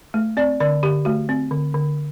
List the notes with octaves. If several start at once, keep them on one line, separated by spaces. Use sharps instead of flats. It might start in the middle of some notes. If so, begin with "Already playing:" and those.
A3
C4 D5
D3 D5
D3 G4
A3 F#4
C4
D3
D3